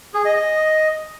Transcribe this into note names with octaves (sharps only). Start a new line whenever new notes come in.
G#4
D#5
D#5